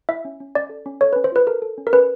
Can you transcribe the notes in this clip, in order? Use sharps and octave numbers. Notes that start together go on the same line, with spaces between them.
E4 E5
C#4
C#4
C#4 D5
A4
C#4
A4 C#5
B4
C#4
C5
F4 B4
A4 A#4
A4
C#4
A#4
C#4 B4